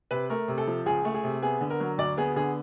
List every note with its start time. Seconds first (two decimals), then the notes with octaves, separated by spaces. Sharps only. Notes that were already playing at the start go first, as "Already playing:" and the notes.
0.11 C3 B4
0.30 A3 A#4
0.48 C3
0.58 A4
0.67 F3
0.86 C#2 G#4
1.05 A3
1.14 G#4
1.24 C3
1.42 B3 G#4
1.61 D3
1.70 A#4
1.80 F#3
1.98 D2 D5
2.17 B3 G#4
2.36 D3 G#4